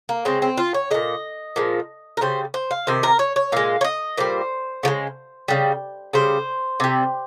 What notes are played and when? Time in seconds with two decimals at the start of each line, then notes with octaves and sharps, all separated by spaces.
0.09 A#3
0.25 C#3 G#3 C4
0.42 C4
0.57 F4
0.74 C#5
0.91 A#2 G#3 D#5
1.56 A#2 F3 G#3
2.17 A#4
2.21 C#3 G3 C5
2.54 C5
2.71 F5
2.87 C3 D#3 C5
3.03 A#4
3.19 C#5
3.36 C#5
3.52 A#2 G#3 F5
3.81 C#5
3.85 D#5
4.17 A#2 G3 C5
4.83 C#3 F3
4.88 G#3
5.48 C#3 G3
6.13 C#3 G3 C5
6.80 C3 G3